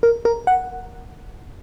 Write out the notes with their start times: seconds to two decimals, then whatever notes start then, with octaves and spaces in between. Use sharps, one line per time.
0.03 A#4
0.25 A#4
0.47 F#5